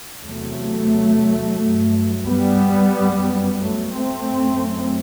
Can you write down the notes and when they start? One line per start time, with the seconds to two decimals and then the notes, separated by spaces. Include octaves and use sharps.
0.25 E2 C3 F#3 A3
1.60 G2
2.27 G3 B3
2.95 F#2
3.61 F#3 A3
3.94 A3 C4
4.29 F#2